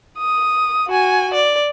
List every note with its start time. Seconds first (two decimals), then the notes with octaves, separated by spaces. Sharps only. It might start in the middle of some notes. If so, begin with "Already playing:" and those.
0.18 D#6
0.88 F#4 G#5
1.34 D5